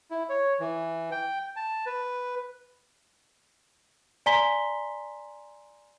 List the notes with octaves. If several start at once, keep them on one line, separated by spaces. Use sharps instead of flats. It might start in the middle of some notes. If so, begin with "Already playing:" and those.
E4
C#5
E3
G5
A5
B4
D5 G#5 A#5 C6 B6 G7